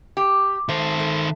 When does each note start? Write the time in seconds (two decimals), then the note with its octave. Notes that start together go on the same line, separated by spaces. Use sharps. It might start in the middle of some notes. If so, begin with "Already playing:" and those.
0.17 G4
0.69 D#3 A3 C5
1.00 A3